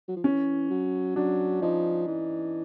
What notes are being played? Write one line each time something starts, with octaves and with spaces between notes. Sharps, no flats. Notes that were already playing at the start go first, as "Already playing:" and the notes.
F#3
F3
E3 C#4
F#3
F#3 D4
F3 D#4
E3